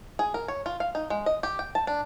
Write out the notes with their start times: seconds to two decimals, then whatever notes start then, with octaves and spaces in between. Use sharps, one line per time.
0.19 G#4
0.34 A#4
0.48 C#5
0.66 F4
0.80 F5
0.95 D#4
1.10 G#3
1.26 D#5
1.43 G4
1.59 G5
1.75 A5
1.87 D4